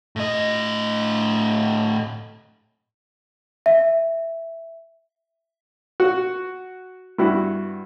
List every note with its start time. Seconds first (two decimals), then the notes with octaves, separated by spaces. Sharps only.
0.16 A2 D#5
3.66 E5
6.00 F#4
7.18 G2 E4 F#4